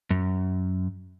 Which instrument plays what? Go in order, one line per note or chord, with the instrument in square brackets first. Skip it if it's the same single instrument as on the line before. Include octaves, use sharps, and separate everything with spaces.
[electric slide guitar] F#2